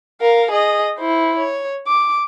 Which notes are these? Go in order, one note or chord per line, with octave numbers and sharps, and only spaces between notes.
A#4 F5
G#4 D#5
E4 C5
C#5
D6